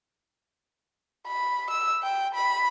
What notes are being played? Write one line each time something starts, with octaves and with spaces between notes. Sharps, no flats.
B5
E6
G5
B5